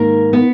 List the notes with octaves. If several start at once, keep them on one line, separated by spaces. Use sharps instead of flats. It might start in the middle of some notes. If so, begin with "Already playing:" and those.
Already playing: G#2 D#3 A#3 A#4
B3 B4